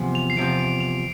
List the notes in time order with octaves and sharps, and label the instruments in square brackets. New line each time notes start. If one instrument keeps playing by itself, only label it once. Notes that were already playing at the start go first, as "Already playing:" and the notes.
Already playing: [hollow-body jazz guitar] E2 C3 F3
[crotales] F7
C7
[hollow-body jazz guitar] E2 C3 F3 [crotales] D7
[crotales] D7
F7